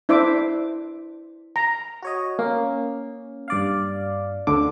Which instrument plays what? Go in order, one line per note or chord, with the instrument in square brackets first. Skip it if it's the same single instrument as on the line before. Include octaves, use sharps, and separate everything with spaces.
[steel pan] D4 E4 C5 E5 D6
A#5
[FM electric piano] F#4 C#5 D#5
[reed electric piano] A#3 [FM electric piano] C#4
[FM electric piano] G2 D5 F5
[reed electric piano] D2 D3 D6